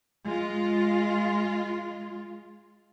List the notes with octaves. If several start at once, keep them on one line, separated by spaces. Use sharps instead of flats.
G#3 F4